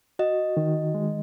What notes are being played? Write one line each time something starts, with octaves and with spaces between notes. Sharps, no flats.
F#4 D#5
D#3
G#3